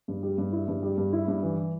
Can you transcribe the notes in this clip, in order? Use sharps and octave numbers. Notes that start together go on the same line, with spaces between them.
G2
G3
G2
E4
G2
G3
G2
E4
G2
E3